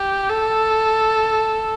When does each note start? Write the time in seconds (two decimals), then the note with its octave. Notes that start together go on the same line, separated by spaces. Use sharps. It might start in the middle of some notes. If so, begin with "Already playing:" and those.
Already playing: G4
0.29 A4